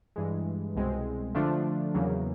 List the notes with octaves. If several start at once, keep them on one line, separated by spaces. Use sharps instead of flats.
G2 E3 G#3
C2 B2 G#3 C4
D3 F3 A3 D4 F4
E2 C#3 F#3 A#3